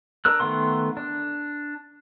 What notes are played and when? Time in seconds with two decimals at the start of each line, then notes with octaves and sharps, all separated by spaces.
0.25 D4 A#4 E6 F#6
0.40 D#3 A3 B3 F#5 C6
0.97 D4